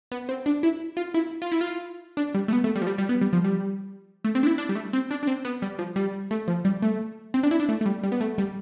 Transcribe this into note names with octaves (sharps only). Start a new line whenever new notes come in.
B3
C4
D4
E4
F4
E4
F4
E4
F4
D4
G3
A3
B3
A3
G3
F3
G3
G3
B3
G3
F3
G3
A3
C4
D4
E4
D4
G3
A3
C4
D4
D4
C4
B3
G3
F3
G3
A3
F3
G3
A3
C4
D4
E4
D4
A3
A3
G3
G3
B3
A3
G3